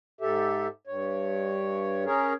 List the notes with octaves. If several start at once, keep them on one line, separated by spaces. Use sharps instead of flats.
G#2 G4 A4 E5
G2 C#5
C#4 G#4 A#4 C#5